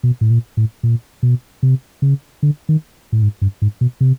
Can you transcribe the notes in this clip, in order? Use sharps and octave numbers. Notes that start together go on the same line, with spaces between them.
B2
A2
A#2
A2
A#2
B2
C3
C#3
D3
D#3
A2
G#2
G2
G#2
B2
C3